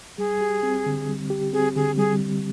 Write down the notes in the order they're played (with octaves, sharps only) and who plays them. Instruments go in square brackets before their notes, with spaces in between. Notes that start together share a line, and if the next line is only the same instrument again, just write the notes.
[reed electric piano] G3 [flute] G#4
[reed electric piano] G4
C4
D3
G3
G4
[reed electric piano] C4 [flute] G#4
[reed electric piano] D3 [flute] G#4
[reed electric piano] G3 [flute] G#4